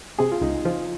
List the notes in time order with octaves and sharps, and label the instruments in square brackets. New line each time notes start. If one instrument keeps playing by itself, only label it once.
[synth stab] C3 [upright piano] G#4
[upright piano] F4
[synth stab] C#2 [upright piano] D#4
[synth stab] F3 [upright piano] F4